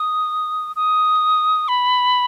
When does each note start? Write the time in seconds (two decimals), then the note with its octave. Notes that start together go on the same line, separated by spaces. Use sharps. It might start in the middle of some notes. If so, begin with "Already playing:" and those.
Already playing: D#6
0.76 D#6
1.68 B5